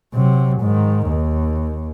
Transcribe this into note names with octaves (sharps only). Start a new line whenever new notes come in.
C3 F#3
G#2 D#3
D#2